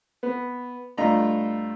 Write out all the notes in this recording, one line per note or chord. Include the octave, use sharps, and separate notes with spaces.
B3
G2 A3 D4 F4 D#5 A#5